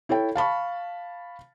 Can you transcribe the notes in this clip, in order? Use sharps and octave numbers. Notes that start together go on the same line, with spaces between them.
E4 A4 C#5 G5
F5 A5 B5 C#6